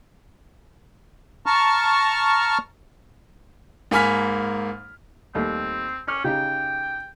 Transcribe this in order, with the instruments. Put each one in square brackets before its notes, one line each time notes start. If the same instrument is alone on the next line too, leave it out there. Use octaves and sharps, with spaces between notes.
[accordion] A5 A#5 C#6 F6
[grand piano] G#2 A#3 G#5 B5 F6 B6
[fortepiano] D#2 G3 A3 [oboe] C4
[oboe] C#4 [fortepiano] D6 F6
[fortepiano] C#3 D#4 G4 [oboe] G5